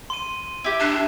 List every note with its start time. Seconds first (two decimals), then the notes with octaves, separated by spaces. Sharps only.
0.10 C6 D#7
0.64 E4 G4
0.81 D4